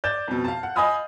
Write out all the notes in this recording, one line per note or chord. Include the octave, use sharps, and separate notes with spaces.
D5 G6 A6 E7
F2 B2
F5 A5
F#5
D#5 F5 G#5 B5 D#6 F6